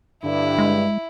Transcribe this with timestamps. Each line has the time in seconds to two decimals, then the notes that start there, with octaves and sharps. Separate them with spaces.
0.24 G2 D3 E4
0.58 G#3